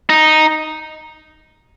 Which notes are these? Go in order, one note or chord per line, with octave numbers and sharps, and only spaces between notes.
D#4